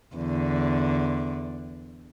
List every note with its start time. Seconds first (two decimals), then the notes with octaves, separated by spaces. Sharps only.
0.16 E2 D3